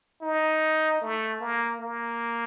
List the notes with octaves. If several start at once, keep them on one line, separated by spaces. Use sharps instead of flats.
D#4
A3
A#3
A#3